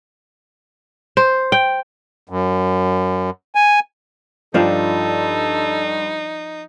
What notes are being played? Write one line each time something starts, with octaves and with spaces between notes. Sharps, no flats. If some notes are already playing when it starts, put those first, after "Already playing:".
C5
G5
F#2
G#5
G2 F3 D4 D#4 A4 F5 G5